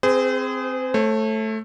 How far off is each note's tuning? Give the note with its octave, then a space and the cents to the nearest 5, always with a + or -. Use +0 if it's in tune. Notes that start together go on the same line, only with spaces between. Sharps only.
C4 +0 G#4 +0 C5 -40
A3 +0 C#5 -45